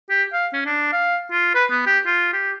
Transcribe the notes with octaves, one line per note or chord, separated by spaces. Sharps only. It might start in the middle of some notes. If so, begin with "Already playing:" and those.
G4
F5
C#4
D4
F5
F4
B4
B3
G4
F4
G4